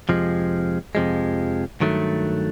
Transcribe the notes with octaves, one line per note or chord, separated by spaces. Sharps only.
F2 C3 F3 G#3
F2 C3 F3 G#3
G2 D#3 F#3 A3